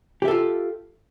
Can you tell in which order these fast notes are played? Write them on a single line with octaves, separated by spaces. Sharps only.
G4 E5 A4 F4